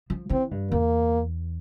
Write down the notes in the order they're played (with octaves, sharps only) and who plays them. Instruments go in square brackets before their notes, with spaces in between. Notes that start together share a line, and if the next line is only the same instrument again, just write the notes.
[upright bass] F3
[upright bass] E3 [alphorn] C4
[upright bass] G2
[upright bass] E2 [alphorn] A#3